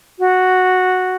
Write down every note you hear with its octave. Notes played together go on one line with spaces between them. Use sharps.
F#4